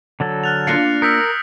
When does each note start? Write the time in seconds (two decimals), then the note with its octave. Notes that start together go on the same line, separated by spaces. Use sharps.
0.20 D3 F#3 A4
0.44 F6 F#6 A6 F7
0.67 A#3 D4 F4 F#6 A#6 C7 C#7
1.02 A#4 D#6 E6 G6 B6 C#7 D7